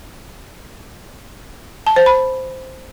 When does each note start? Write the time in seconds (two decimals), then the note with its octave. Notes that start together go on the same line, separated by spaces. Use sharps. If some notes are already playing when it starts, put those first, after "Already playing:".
1.87 A5
1.96 C5
2.06 B5